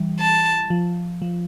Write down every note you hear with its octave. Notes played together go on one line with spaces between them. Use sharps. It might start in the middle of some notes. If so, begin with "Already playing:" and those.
Already playing: E3 G3
A5
F3
F3